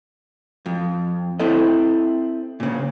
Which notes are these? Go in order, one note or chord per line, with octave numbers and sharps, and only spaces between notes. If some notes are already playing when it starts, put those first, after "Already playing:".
F2
C4 E4 A4 D#5
A#2 C#3